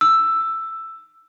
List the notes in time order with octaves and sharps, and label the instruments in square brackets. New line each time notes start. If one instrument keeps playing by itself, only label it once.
[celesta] E6